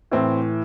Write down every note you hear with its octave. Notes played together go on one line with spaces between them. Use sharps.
A2 E3 C4